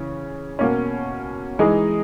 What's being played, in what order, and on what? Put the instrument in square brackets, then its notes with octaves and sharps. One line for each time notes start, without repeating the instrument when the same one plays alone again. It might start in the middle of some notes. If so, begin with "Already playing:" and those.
Already playing: [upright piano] C#3 E3 C#4
B2 A#3 C#4
E3 G#3 D#4 G#4